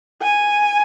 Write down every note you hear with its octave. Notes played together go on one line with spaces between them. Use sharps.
G#5